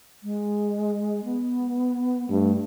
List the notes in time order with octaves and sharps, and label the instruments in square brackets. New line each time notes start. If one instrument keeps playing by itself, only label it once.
[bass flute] G#3
B3
[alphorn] G2 [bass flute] A3